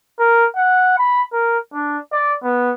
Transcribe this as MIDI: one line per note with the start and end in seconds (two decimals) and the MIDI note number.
0.19 0.46 70
0.56 0.95 78
0.99 1.23 83
1.33 1.58 70
1.74 1.98 62
2.12 2.34 74
2.43 2.74 59